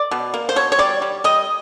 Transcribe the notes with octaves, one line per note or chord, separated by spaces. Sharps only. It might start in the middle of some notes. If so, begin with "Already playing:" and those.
Already playing: D5
B2
A#3
C5
B2 C#5
C#5
G3 D5
G3
G3 D#5